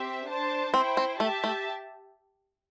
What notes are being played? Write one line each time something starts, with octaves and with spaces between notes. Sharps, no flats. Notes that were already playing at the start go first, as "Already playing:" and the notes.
Already playing: C4 G4 E5
D4 C5 A5
C4 E4 C5 G5
C4
A3 G4 E5 A5
A3